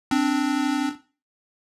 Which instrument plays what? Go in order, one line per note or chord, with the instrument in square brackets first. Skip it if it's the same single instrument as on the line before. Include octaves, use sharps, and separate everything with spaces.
[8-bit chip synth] C4 D4